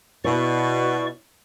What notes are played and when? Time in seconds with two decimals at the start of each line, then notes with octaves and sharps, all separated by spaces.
0.25 B2 E4 C#5 D5 C#6